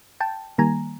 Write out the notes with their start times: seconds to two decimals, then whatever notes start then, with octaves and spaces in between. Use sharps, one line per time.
0.20 G5 A5
0.58 D#3 G3 A#3 G#5 A#5